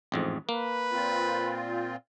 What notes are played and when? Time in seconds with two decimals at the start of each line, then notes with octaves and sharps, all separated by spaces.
0.12 A1 F2 G#2
0.49 A#3 B4
0.92 A#2 C4 F4